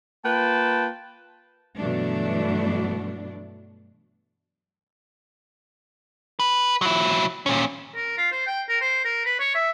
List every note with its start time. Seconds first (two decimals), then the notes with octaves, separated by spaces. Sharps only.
0.24 A#3 F4 B4 G5 A5
1.76 G2 B2 E3 F#3 A3 D4
6.40 B4
6.82 F#3 E4
7.46 A#2 C#4
7.95 A#4
8.17 F4
8.32 C5
8.47 G5
8.69 A#4
8.81 C5
9.05 A#4
9.26 B4
9.40 C#5
9.55 E5